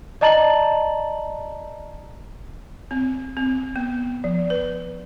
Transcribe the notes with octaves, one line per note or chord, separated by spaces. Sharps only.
D5 D#5 A5 A#5 A6 F#7
C4
C4
B3
F3
B4